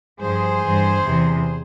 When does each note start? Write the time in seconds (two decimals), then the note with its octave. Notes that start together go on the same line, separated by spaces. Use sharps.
0.20 G2 F3 G#4 C5
0.62 G2 E3
1.03 E2 C3 E3